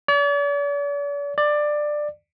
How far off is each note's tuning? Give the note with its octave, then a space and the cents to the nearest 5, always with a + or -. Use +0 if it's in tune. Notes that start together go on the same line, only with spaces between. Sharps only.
D5 -45
D5 +15